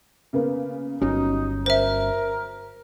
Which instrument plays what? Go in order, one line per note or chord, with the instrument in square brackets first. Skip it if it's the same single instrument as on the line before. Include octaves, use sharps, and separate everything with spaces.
[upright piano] C#3 A#3 B3
[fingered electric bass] G1 C#4 [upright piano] F#3 [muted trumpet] D#4
[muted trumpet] A#4 [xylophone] C5 E5